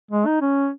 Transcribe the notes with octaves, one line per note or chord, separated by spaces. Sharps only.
G#3
D#4
C#4